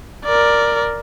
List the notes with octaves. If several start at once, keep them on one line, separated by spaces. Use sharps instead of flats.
A#4 D5